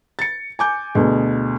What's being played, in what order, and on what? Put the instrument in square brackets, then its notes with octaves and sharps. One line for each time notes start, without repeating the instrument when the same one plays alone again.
[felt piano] A6 C#7
G#5 D6 G6
D2 B2 G#4